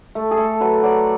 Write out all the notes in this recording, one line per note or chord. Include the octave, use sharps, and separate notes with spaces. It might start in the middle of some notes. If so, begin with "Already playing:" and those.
A3
G#4
A3 A4
F#3 B4
F#3 D5